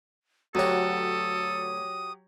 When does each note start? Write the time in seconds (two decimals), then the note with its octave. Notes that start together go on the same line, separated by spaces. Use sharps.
0.55 D2 F#3 F#4 G4 A4 C#5 D#6